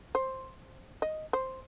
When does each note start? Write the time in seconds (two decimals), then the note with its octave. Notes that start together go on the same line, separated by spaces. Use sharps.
0.15 C5
1.02 D#5
1.33 C5